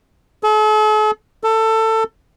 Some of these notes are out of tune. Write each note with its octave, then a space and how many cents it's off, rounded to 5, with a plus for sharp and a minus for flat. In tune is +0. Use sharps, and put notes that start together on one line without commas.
A4 -45
A4 +20